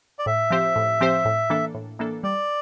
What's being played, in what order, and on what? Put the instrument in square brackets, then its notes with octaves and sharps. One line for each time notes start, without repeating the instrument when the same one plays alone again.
[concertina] D5
[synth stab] A2 [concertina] E5
[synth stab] F3 C4 G4 C5
A2
F3 C4 G4 C5
A2
E3 A#3 D4 A4
A2
E3 A#3 D4 A4
[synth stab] G3 [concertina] D5